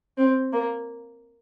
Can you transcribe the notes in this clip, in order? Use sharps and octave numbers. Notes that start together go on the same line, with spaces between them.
C4
A#3